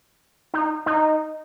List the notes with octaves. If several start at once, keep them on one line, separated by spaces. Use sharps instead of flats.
D#4
D#4